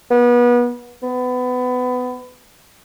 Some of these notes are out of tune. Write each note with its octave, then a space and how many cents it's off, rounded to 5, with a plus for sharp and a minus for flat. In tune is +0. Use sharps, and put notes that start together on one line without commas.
B3 -30
B3 +25